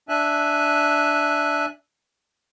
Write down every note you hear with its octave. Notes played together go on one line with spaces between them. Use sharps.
D4 E5 G#5 F#6